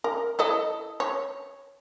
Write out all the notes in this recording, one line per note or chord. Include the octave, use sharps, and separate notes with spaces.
A#4
E4 A4 D#5
C#5